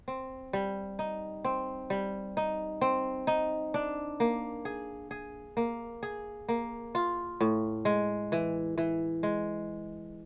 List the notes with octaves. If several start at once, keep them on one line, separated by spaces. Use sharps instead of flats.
C4
G3
D#4
C4
G3
D#4
C4
D#4
D4
A#3
G#4
G#4
A#3
G#4
A#3
F4
A2
G#3
E3
E3
G#3